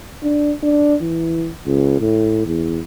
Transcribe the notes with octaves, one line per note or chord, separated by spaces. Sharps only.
D4
D4
E3
C#2
A2
E2